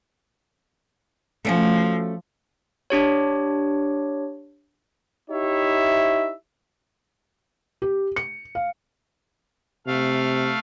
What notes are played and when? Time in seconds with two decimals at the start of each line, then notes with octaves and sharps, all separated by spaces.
1.45 F3 A3 C#4 F#4
2.90 D4 G4 C#5
5.30 D#4 E4 G4 C#5 E5
7.82 G4
8.16 C#7
8.55 F5
9.87 C3 A3 F5